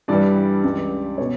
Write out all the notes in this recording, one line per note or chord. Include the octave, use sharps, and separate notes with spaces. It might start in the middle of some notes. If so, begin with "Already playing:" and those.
G2 E3 G3 D5
C#2 C#3 G3
B2 C#5